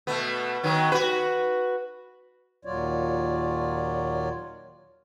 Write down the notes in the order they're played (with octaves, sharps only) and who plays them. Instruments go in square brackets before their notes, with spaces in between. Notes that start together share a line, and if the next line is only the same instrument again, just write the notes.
[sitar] B2 A3 B3
D#3 F#3 B3
F#4 B4
[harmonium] D#2 A#2 F#3 F4 C#5 D5